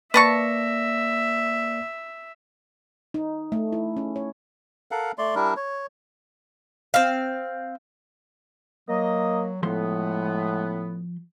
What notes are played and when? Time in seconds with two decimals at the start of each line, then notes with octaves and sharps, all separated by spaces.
0.14 A#3 B4 D5 E5 A5 C#6 A#6
3.14 D#4
3.52 A3
3.72 E4
3.97 C#4
4.16 C#5
4.91 A4 A#4 F5 F#5
5.18 A3 D5 C6
5.35 G3 D4 E4 A#4
5.56 C#5
6.94 C4 F5
8.89 F#3 A#3 D#5
9.63 A2 F3 G#3 B3 A4 C6